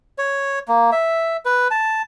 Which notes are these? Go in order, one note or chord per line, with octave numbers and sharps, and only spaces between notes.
C#5
A#3
E5
B4
A5